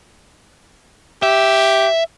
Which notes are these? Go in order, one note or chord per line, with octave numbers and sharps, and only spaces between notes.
G4 E5